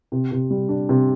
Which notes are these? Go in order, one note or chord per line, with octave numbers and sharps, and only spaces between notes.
C3
C3
G3
D4
C3